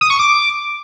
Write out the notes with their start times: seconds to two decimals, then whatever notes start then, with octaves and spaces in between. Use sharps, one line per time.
0.01 D#6
0.10 C#6
0.19 D6